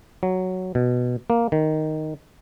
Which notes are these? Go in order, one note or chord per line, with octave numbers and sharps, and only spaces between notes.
F#3
B2
A#3
D#3